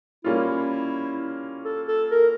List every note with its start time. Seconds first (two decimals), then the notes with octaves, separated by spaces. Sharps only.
0.24 G3 A#3 C#4 E4 F4
1.65 A4
1.88 A4
2.11 A#4